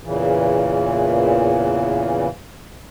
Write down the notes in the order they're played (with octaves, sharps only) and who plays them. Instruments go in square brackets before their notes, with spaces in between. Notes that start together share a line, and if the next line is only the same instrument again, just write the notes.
[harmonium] E2 A#2 C#3 E3